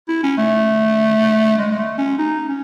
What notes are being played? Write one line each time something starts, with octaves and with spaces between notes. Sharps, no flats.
E4
C#4
A3
G#3
G#3
A3
C#4
D#4
C#4